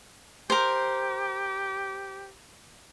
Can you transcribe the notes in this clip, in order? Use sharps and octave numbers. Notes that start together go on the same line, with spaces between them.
G4 A#4 C5